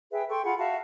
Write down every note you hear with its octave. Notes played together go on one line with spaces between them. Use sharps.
G#4 B4 E5 G5
A4 G5 C6 C#6
F4 G#4 F#5 B5
F#4 E5 F5 A5